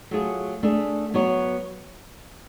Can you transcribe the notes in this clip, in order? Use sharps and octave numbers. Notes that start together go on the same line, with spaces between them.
F#3 A3 F4 G#4
A3 D4 G#4
F#3 B3 F#4 C#5